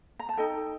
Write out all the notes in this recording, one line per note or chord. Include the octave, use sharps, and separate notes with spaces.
A#5
A5
D#4 A4 D#5 G5